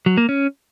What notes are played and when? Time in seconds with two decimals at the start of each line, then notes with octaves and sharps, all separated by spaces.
0.06 F#3
0.17 A#3
0.29 C#4